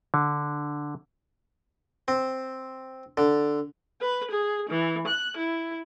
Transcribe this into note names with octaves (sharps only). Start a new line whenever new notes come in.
D3
C4
D3
B4
G#4
E3
F#6
E4